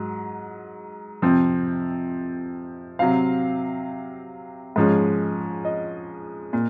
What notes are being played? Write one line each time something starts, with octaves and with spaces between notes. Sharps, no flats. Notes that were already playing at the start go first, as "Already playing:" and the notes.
Already playing: G#2 F#3
F2 C3 F3 C4
C3 F#3 C4 F5
G#2 F3 G#3 C#4
D#5
A#2